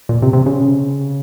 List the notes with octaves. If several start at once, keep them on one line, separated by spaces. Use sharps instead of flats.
A#2
C3
C3
C#3